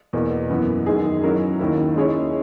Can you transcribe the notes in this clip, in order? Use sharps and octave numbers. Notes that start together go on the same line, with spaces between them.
E2 B2 A#3
F#2 E3 B3
F#2 D#3 G#3 D#4 G#4
F#3 C#4 E4 A#4
D#2 D#3 A#3 E4
G#3 C#4 E4 G#4 C#5